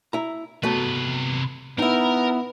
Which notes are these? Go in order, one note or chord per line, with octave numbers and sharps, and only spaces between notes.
E4 A#5
C3 F#3 A3 B3 B4
B3 D#4 E4 A#4